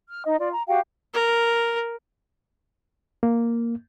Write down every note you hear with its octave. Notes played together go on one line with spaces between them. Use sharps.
F6
D#4 D#5
F4 D5
A#5
F#4 G4 F5 G5
A#4
A#3